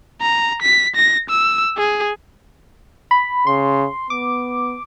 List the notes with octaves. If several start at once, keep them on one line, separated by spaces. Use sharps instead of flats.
A#5
B6
A#6
E6
G#4
B5
C#3 C6
B3 D6